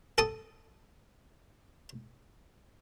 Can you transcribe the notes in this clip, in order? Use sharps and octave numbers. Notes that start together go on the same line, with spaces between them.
A4 A5 D#6